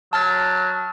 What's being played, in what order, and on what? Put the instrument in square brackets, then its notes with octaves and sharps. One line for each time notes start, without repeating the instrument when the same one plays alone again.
[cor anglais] F#3 [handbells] A5 F6 A6